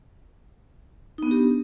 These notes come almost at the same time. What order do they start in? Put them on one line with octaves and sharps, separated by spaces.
D#4 B3 D4 G4